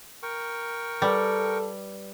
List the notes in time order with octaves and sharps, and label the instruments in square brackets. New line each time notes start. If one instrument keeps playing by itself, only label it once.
[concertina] A#4 G5 C#6
[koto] G3 [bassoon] A4 [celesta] B4 D5